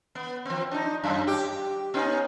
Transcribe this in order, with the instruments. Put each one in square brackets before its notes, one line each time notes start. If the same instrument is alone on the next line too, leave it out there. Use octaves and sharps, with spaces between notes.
[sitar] B3
F3 C4
D4 D#4
F#2
G4
B3 C#4 D#4